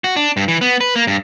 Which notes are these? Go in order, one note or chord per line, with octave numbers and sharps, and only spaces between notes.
F#4
D4
G2
E3
B3
B4
A#3
G2